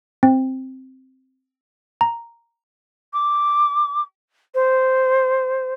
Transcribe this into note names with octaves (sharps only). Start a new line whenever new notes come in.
C4
A#5
D6
C5